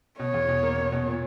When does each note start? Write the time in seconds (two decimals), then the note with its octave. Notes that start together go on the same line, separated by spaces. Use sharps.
0.19 B2 C#5
0.34 E2
0.49 B2
0.63 A#3
0.78 B2
0.92 B2
1.07 A#2